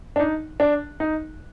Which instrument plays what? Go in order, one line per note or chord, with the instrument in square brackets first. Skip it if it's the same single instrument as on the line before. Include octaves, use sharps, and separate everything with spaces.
[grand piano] D4
D#4
D4
D#4